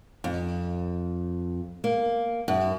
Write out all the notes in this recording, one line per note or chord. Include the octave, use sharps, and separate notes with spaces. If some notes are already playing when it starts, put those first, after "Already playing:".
F2
A#3
F#2